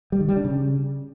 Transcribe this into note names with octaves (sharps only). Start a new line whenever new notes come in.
G3
D#3
G3
D4
C#3